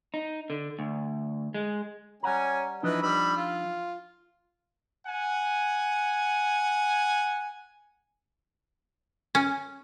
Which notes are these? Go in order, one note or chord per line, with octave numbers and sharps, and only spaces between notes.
D#4
D3
D2
G#3
G3 C#4 F#5 G#5 A#5
E3 F3 D4 D#4 B4 D#5
G3 B5 E6
F4
F#5 G#5
C#4